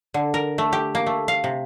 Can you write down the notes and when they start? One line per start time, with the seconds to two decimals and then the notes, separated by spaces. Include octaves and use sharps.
0.14 D3
0.34 A#4
0.58 A3
0.73 G4
0.95 A#3
1.07 A3
1.28 F5
1.44 C3